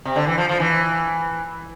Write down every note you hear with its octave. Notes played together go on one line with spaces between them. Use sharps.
C3
D3
E3
F3
F3
E3